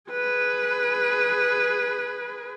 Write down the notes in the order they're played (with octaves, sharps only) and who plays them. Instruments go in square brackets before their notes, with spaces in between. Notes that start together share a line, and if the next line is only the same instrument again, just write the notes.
[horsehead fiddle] G#4 B4